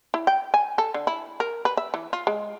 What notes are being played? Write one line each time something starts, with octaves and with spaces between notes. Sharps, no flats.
E4
G5
G#5
A4
D3
E4
A#4
B4
E5
E3
F4
G#3